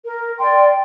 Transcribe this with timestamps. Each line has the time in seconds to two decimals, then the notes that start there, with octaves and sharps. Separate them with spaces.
0.05 A#4
0.39 D5 G5 C6